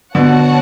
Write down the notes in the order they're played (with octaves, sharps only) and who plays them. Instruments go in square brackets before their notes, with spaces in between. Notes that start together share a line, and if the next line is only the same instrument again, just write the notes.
[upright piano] B2 D3 [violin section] B3 F#4 C#5 F#5 A5